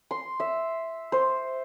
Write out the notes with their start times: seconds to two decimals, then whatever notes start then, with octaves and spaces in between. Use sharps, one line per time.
0.11 C6
0.40 E5
1.12 C5